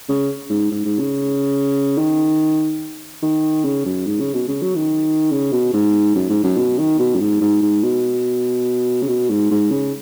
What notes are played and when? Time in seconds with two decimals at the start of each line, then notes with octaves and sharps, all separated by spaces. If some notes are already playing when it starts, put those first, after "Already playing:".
0.09 C#3
0.50 G#2
0.71 G#2
0.85 G#2
0.99 C#3
1.97 D#3
3.22 D#3
3.64 C#3
3.86 F#2
4.06 G#2
4.20 C#3
4.33 B2
4.48 C#3
4.62 F#3
4.76 D#3
5.32 C#3
5.52 B2
5.73 G#2
6.15 F#2
6.30 G#2
6.44 F#2
6.57 B2
6.78 D#3
6.99 B2
7.15 F#2
7.20 G#2
7.41 G#2
7.62 G#2
7.83 B2
9.02 C#3
9.08 B2
9.29 G#2
9.51 G#2
9.71 C#3